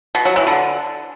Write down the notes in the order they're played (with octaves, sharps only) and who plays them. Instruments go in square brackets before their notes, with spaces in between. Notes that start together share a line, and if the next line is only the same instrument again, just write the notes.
[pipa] B2
F#3
E3
D3